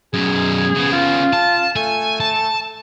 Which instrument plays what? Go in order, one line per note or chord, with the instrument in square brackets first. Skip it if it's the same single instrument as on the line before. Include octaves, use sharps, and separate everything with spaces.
[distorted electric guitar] F#2 B2 [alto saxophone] G#4
[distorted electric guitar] C#3 B3
[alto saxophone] F4
[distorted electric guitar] A5
[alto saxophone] A3 [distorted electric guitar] G#5
[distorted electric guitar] A5